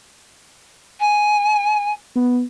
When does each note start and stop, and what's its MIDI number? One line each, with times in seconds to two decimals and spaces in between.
1.00 1.91 80
2.16 2.42 59